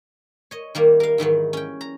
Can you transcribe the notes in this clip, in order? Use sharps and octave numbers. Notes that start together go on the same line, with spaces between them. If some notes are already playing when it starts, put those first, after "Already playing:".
C#5 D#5
D#3 G3 A#3
A#4 F5
G#2 D#3 E3 F#3
C#4 G5
A#5